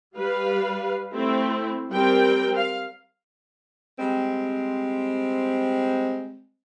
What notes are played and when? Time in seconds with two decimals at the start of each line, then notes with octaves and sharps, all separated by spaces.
0.17 G3 B4 F5
1.13 A3 C4 E4
1.91 G3 C4 A#4 G5
2.57 F5
3.99 G3 G#3 C4